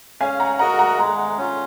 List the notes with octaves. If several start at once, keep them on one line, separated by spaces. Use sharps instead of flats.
C#4 F5 G#5
F#5 A#5
F#4 A#4 D#5 F#5 A#5
F#5 A#5
G#3 F#5 A#5
C#4 F4